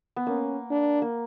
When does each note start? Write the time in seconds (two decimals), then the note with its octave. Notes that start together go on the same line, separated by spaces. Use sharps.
0.16 B3
0.27 A#3 C#4
0.71 D4
1.02 A#3